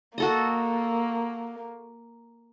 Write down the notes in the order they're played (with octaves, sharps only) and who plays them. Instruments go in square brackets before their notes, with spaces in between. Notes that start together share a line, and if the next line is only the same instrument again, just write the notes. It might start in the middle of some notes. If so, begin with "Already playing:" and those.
[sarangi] A#3 [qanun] F#4 A4 D#5